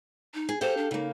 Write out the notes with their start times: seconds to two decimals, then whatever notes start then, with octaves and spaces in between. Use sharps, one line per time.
0.34 D#4
0.49 G#4
0.61 G4 A4 C5 F5
0.77 D4
0.91 C#3 A#3 D#4